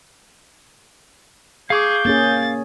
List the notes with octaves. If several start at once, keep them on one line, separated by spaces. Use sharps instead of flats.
G#4 F5 C#6 D6 G6
A#3 C#4 G#4 A6